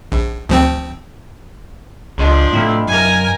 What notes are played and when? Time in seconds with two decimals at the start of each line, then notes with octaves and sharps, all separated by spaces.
0.12 A#1
0.49 D2 F3 C4
2.18 C#2 F3 D4 D#5 C6
2.53 A2 C3 A3 E4 B4 F5
2.87 F#2 A#4 G#5